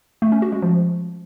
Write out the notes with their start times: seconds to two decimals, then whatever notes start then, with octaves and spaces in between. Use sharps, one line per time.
0.22 A3
0.32 C#4
0.42 F#4
0.52 G#3
0.62 F3